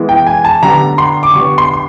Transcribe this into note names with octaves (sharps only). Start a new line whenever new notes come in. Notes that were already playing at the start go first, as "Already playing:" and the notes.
Already playing: E3 G#3 B3 E4
G5
G#5
A5
D3 G3 B3 A#5
C6
D6
D3 G3 B3 C#6
C6
C6